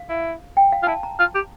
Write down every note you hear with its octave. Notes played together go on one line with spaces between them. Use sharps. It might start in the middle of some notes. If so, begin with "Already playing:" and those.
Already playing: F5
E4
G5
F5
F4
E4 A5
A#5
F4
G4